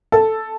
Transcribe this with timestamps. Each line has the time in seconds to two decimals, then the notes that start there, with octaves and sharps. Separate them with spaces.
0.12 A4